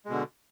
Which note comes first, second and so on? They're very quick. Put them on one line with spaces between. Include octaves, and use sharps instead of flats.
G#3 B2 D3